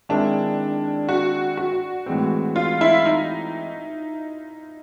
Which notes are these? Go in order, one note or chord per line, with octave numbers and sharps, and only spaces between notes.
D#3 G#3 C4 D4 E4
F#4
F#4
A2 E3 G#3 C4
F4
E4
D#4